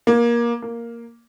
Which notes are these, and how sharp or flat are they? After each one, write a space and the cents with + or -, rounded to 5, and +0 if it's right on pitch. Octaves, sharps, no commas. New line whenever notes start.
A#3 +20
A#3 +0